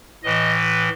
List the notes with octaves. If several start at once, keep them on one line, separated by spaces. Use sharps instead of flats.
A2 E3 D#5
B4